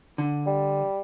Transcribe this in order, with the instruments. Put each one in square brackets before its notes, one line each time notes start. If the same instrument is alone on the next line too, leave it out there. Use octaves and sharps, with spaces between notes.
[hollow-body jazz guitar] D3
[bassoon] G3